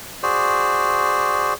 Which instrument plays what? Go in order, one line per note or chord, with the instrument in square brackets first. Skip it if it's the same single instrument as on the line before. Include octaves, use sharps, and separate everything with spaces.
[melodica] F#4 G#4 C5 D5